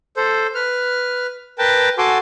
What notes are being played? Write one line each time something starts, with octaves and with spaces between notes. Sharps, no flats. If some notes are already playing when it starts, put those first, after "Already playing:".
A4 C5
B4 F6
A#4 B4 G5 A5
F#4 A4 G#5 A5 C6 D6